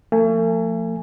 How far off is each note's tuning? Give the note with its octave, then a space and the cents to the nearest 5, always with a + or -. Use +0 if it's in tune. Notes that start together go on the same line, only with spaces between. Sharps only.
F3 +0 A3 +40 G#5 +0